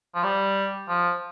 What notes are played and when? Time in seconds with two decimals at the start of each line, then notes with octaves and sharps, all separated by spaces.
0.15 F3
0.23 G3
0.88 F3